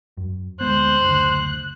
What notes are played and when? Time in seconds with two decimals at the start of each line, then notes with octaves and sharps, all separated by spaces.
0.17 F#2
0.61 D2 G#3 B3 C5 F#6
1.02 F#1 D2